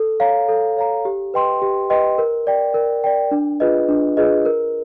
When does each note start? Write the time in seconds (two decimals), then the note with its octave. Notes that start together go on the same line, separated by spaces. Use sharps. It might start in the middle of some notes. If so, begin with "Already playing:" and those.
Already playing: A4
0.20 C#5 F5 A#5
0.48 A4
0.77 C#5 F5 A#5
1.05 G4
1.34 B4 D#5 G5 C6
1.62 G4
1.90 B4 D#5 G5 C6
2.18 A#4
2.47 D5 G5
2.74 A#4
3.04 D5 G5
3.31 D4
3.60 F4 G#4 B4 D#5
3.89 D4
4.17 F4 G#4 B4 D#5
4.45 A#4